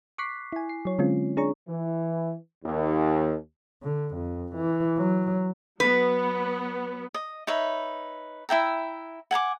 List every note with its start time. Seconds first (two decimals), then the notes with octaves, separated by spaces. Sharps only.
0.18 C#6 D6 F#6 B6 C7
0.53 E4 G#5
0.69 C7
0.85 F#3 C#5
0.99 D3 G#3 C4 C#4 F4
1.37 D4 G#4 C#5 A#5 C#6
1.67 E3
2.64 D#2
3.83 D3
4.15 F2
4.55 E3
4.98 F#3
5.80 F#3 B3 B4
7.14 D#5
7.47 D#4 B4 C#5 E5
8.49 E4 E5 G5 A#5
9.31 F#5 G#5 A#5 D6